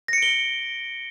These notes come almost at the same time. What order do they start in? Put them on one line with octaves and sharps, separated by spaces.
A#6 C#7 D7 G7